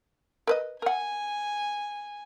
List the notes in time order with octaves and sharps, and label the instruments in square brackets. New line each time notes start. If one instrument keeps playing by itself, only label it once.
[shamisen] A#4 B4 D#5
[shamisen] A#4 F#5 [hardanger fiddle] G#5